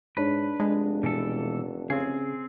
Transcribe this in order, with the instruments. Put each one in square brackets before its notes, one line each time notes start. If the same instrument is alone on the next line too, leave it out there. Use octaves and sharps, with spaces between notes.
[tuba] G#2 [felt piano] D4 C#5 [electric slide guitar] B4
[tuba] F1 [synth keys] G#3 [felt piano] D4
[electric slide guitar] B2 E3 A4
[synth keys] C#3 [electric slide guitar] C4 G#4